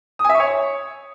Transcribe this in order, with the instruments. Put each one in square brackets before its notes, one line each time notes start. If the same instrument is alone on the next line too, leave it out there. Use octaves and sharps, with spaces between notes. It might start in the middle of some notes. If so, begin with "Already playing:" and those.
[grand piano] D#6
G#5
E5
C#6
C#5